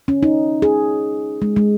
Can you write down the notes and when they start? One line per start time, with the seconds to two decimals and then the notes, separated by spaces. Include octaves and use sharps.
0.08 C#4
0.23 D#4
0.62 G#4
1.42 G#3
1.56 G#3